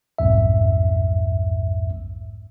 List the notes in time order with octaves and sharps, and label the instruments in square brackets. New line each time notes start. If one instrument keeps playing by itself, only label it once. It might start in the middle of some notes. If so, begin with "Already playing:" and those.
[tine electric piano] B1 F2 G#2 E5